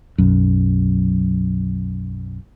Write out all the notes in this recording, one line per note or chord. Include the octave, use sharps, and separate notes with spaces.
B1 F#2